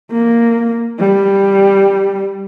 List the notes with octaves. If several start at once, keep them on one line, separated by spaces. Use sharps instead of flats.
A#3
G3